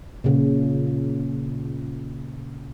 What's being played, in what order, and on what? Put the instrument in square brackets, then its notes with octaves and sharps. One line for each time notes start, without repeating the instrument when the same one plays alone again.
[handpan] A#2 C#3